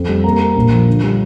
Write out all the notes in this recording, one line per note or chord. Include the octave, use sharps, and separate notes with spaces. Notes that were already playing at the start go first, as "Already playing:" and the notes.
Already playing: F2
G3
A#3 A#5
A#3
A#1
F3
D3
G3